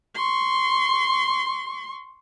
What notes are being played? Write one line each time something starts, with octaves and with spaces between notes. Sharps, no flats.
C6 C#6